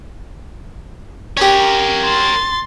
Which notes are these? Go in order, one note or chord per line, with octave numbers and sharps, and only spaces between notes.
C#4 G4 A#4 C#5
C6 A6